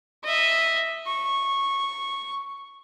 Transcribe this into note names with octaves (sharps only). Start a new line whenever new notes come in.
D#5 E5
C#6